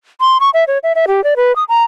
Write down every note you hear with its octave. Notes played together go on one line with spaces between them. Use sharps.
C6
C#6
E5
C#5
E5
E5
G4
D5
B4
D#6
A#5